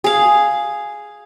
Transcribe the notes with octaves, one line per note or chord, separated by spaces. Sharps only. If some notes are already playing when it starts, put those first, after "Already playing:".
G#4 F5